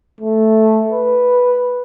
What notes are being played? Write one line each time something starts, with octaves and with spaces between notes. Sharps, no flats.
A3
B4